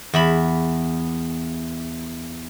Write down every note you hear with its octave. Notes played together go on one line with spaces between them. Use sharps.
E2 E5 B5